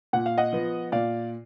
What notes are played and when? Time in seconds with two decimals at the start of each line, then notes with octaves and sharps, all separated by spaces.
0.13 A#2 F#5
0.26 F5
0.38 D#5 F#5
0.53 F3 B3
0.92 A#2 D5 F5